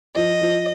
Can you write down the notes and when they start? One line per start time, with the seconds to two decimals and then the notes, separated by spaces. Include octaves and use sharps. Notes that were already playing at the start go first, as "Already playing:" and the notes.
0.16 F3 D#5
0.41 F3